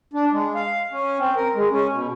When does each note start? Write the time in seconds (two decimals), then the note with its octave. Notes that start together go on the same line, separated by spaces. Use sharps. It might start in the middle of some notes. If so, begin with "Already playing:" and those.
0.13 D4
0.32 G#3
0.55 F5
0.92 C#4
1.19 C4
1.36 A#4
1.55 G#3
1.71 C#4
1.92 B2